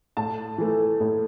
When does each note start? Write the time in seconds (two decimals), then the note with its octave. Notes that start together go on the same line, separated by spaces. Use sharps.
0.17 A2 A5
0.58 E3 A3
1.00 A2